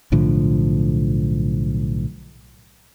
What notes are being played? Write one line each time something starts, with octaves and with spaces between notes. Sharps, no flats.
B1 A2 D3 F3